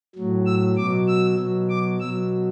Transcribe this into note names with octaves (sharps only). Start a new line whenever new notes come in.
A2 F#3
E6
B2 F#3 D6
E6
B2 F#3
D6
B2 F#3 E6